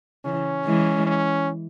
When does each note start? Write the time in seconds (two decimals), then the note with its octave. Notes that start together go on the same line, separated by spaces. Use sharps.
0.25 C#3 E3 C#4
0.65 E3 G#3
1.06 C#4